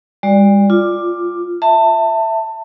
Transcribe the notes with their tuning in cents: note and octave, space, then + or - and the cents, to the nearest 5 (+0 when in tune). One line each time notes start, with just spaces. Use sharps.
G3 +45 F#4 +0 D5 +0
F4 +0 D6 +10
E5 +0 A5 +25